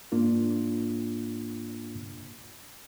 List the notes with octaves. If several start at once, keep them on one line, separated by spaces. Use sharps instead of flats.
G#2 A#3 D4 F4